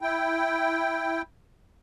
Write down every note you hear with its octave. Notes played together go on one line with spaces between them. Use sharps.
E4 G5